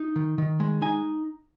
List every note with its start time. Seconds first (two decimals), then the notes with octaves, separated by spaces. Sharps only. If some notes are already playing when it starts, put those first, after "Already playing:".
Already playing: D#4
0.16 D#3
0.38 D#3
0.60 G#3
0.82 D#4 G#5